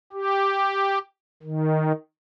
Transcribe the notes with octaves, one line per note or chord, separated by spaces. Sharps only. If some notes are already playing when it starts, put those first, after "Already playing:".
G4
D#3